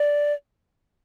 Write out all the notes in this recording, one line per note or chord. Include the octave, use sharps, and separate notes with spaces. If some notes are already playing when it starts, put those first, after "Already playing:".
Already playing: D5